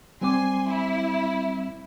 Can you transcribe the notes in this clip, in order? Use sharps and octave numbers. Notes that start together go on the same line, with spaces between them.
G3 C4 G#5 C6 D6
E4